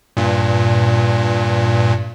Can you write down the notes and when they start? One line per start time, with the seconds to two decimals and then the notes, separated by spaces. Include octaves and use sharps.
0.17 G2 A#2